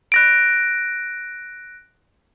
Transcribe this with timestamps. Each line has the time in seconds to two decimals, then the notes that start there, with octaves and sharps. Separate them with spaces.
0.12 F#6 A#6 D7